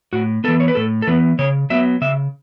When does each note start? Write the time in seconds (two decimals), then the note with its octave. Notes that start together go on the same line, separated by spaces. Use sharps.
0.13 A2 F#4
0.44 E3 B3 A4
0.60 C#5
0.68 B4
0.75 A2 A4
1.02 A4
1.07 E3 B3 B4
1.39 C#3 C#5
1.70 F#3 B3 E5
2.01 C#3 E5